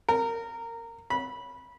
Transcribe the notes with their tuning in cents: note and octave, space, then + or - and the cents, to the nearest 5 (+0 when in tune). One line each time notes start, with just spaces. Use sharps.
A#4 -20
B5 -15